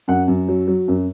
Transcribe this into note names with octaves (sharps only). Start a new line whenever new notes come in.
F#2 F#5
F#2
F#3
F#3
F#2